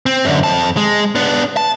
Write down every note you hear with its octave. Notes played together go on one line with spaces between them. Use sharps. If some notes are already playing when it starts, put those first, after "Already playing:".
C4
F#2 D3
F2 A5
G#3
B3 D4
A5